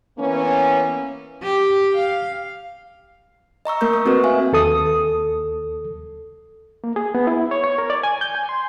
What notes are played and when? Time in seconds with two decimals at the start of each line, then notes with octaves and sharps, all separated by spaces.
0.18 E3 A#3 B3 C#4
1.43 G4
1.94 F5
3.65 D#5 A#5 C#6 E6
3.81 A3 A#3 A#4 C#6 G6
3.93 D#6
4.06 C4 F#4 A4 B4
4.24 E5 F5 G#5
4.52 D#2 A4 D#6
6.84 A#3
6.96 G#4
7.15 B3
7.27 E4
7.51 C#5
7.64 C#5
7.78 A#4
7.90 D5
8.03 G#5
8.21 G6
8.35 G#5
8.49 C6